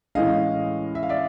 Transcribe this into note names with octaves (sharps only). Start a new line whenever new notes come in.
A2 E3 G#3 C#4 D#5 F5
E5
F5
D5 E5